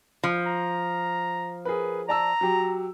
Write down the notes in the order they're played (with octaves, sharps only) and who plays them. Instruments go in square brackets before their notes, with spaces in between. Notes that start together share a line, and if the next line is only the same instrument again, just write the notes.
[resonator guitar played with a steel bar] F3
[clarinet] A#5
[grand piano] G#4 A#4 B4
[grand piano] D5 A5 E6 [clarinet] A#5
[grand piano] F#3 G4